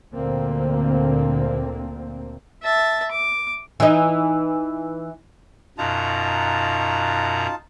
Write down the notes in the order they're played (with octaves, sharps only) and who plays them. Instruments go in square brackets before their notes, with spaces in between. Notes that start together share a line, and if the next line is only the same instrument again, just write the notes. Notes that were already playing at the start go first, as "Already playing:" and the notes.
[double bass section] D2 A#2 D3 A#3 C4
[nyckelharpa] E5 A5
D6
[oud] E3 D#4
[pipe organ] F#2 B2 A#5 [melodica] D#4 F4 A5